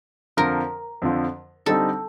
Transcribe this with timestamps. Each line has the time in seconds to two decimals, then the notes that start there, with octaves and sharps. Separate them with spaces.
0.37 F2 D3 F3 A#4
1.02 F2 D3 F3
1.66 D3 G3 C4 D#4 A4